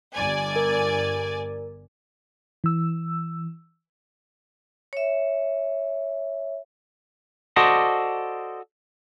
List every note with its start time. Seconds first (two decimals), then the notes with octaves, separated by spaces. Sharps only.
0.14 G1 D5 G#5
0.56 A#4
2.64 E3 E6
4.93 C#5 E5
7.56 F#4 A4 C5 D5 D#5